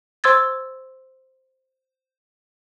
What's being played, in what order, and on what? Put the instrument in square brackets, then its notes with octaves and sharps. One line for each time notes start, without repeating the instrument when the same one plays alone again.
[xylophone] C5 C6 E6 G#6 A6